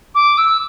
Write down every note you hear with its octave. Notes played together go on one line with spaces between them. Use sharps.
D6
E6